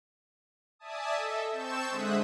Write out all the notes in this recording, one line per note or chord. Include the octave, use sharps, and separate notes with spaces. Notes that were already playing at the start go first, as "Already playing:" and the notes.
D5 E5 G#5 A5 D#6
A4 D#5 E5
C4 A5 C#6 E6 G6 E7
D3 G#3 C5 E5 D#6 F#6